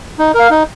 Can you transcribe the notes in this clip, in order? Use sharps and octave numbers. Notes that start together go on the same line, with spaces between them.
D#4
A#4 F5
D#4